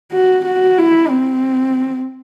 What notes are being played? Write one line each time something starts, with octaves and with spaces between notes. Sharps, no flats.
F#4
F#4
E4
C4